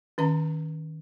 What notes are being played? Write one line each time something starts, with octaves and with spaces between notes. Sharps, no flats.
D#3 C#4 A#5